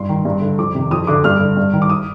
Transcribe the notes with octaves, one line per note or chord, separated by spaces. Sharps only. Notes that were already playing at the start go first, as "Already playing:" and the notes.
Already playing: G2 C6
D#3
G2
D3
F2 D6
C3 D#3
F2 D#6
D3 D6
G2 F6
D3
G2
D#3
D6
D#6